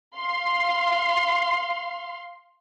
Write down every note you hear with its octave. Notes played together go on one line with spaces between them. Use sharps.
F5 C6